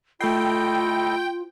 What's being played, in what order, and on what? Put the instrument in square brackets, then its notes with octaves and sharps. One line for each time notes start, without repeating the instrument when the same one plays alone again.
[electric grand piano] A3 C7 [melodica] E4 A4 D#5 [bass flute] F4 [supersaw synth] G5